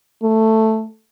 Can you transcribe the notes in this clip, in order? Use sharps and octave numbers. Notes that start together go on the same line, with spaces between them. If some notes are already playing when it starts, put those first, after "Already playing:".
A3